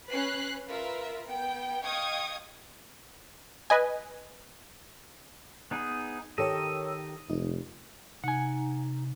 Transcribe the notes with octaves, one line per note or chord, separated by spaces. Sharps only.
C#4 B4 F#6 C7
F4 A#4 B4 E5
B3 G5
D#5 F5 G5 C#6 D#6 G#6
B4 D#5 G#5
B3 D#4 G#4
D#3 G4 A4 A#4 C#5 D#5 E6
F1 D#4
C3 D#4 F#5 G#5